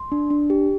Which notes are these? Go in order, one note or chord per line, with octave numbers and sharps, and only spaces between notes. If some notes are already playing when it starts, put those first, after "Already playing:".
Already playing: C6
D4
D4
G4